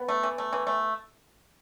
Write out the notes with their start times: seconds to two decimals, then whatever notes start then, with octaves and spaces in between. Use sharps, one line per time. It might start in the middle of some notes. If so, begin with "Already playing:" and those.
Already playing: B3
0.08 A3
0.23 E3
0.38 A3
0.53 E3
0.67 A3